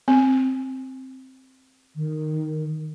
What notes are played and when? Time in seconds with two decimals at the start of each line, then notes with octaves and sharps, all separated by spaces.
0.08 C4
1.96 D#3